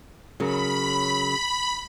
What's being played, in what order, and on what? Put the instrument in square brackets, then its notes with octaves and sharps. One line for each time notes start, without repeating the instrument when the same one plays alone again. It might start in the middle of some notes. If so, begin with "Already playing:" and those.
[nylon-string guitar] C#3 F#3 A#4 [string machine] B5